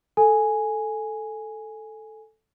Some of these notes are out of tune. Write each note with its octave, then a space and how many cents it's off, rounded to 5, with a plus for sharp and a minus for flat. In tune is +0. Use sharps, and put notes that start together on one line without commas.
A4 +0 G#5 +0